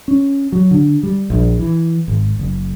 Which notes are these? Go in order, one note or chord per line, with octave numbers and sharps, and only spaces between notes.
C#4
F#3
D3
G3
A#1
E3
G#1
F#1